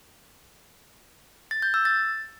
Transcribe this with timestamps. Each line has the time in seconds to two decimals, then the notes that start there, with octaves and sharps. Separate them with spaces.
1.51 A6
1.62 G6
1.74 E6
1.85 A6